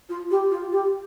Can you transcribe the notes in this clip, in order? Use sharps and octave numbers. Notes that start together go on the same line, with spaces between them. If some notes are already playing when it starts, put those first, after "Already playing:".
F4
G4
F4
G4